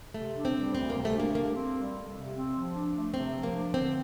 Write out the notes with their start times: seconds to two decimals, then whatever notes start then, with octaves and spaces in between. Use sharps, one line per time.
0.14 C3 A3
0.35 D4
0.45 C4
0.55 G3
0.75 D2 C4
0.90 A#3
0.95 C3
1.05 A3
1.15 A#3 D4
1.35 C3 A#3
1.55 C4
1.75 G3
1.94 F2
2.15 C3
2.34 C4
2.55 F3
2.74 D4
2.93 A3
3.14 C3 C4
3.34 F3
3.43 A#3
3.54 D4
3.73 D3 C4